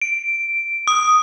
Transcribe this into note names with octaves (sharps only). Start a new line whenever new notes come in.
D7
D#6